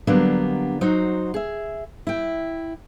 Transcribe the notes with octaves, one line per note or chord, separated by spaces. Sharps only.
D3 F#3 G3 A#3 B3 D4
F#3 D#4 F#4 C5
G#4 E5
E4 G5